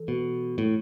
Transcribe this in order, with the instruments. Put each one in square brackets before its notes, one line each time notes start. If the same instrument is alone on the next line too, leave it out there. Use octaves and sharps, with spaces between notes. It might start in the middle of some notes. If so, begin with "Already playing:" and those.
Already playing: [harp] E3 A4
[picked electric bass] B2
A2